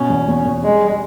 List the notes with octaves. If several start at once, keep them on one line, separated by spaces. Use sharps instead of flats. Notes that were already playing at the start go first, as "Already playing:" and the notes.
Already playing: B2 C#4
E2
E2
E2
G3 G#3
G3